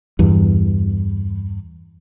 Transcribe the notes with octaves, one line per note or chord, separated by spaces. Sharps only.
E2 G2